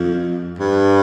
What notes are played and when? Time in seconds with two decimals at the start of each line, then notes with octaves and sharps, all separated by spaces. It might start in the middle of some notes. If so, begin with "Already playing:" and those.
Already playing: F2
0.59 G2